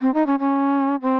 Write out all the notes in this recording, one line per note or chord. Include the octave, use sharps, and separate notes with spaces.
C4
D#4
C#4
C#4
C4